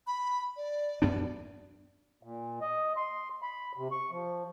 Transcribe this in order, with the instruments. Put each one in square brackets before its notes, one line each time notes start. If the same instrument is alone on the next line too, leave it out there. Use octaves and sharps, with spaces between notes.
[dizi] B5
D5
[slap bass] F#2 B3 D4 [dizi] D5
[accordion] A#2
D#5
C6
B5
C3
C#6
F3